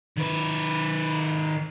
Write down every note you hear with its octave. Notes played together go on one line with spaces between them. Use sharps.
D#3 B4